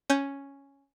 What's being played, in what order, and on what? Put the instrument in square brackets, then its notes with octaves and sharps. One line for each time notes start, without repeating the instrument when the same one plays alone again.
[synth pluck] C#4 G6